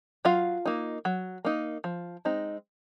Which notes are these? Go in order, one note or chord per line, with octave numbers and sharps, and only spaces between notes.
F#3 F4 F5
A#3 D#4
F#3
A#3 D#4
F3
G#3 C4 D#4